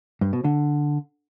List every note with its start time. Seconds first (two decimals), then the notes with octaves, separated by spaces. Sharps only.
0.21 G2
0.33 B2
0.44 D3